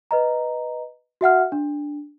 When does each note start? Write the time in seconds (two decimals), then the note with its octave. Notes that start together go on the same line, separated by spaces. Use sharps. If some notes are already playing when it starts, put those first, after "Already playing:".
0.11 B4 D#5 A#5
1.21 F#4 E5 F#5 F6
1.52 D4